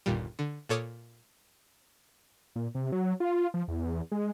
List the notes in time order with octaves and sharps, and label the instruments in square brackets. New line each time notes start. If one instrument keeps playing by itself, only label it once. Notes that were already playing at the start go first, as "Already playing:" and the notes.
[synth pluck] G1 D#2 A#2 G3
D3
A#2 A4 C#5 D6 D#6 F6
[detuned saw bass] A#2
C3
F#3
F4
F3
E2
G#3